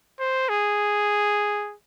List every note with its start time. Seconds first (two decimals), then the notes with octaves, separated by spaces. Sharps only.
0.19 C5
0.49 G#4